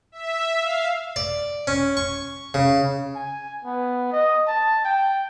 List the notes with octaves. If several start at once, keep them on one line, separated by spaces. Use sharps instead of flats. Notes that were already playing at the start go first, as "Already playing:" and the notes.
E5
F5
D5
C#4
C#6
C#3
G#5
B3
D#5
A5
G5